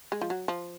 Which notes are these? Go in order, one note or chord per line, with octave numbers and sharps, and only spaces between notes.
G#3
F3
F#3
F3